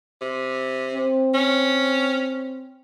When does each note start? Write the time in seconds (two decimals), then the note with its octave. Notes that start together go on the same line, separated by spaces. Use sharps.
0.21 C3
0.94 C4
1.34 C#4